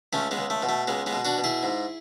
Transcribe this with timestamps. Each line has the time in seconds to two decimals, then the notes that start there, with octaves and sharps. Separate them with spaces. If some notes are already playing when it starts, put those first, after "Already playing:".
0.13 C#2 A3 C#4
0.31 G#3 B3
0.37 C#2
0.50 A3
0.62 B2
0.69 A3
0.87 C#2 G#3 B3
1.06 G#3 B3
1.13 B2
1.25 D4 F#4
1.38 B2
1.44 E4 G#4
1.63 G#2